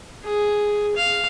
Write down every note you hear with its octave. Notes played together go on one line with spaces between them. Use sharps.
G#4
F5